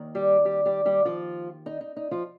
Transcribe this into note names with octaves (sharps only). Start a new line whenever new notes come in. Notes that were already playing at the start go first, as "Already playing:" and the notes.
Already playing: D#2 D#3
G3 G4
G3 G4
G3 G4
G3 G4
F3 F4
D#4
D#4
D#4
F3 F4